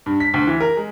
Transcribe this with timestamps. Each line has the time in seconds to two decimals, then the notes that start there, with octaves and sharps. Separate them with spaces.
0.06 G2
0.20 B6
0.34 D2
0.47 E3
0.60 A#4
0.77 G#3